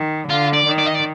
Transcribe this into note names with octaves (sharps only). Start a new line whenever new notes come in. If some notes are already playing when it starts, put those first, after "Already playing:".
Already playing: D#3
D3 F4
D5
D#3
D5
D#5
D5